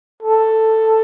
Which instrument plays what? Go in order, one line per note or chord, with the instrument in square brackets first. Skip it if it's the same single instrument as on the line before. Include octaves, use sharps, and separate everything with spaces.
[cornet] A4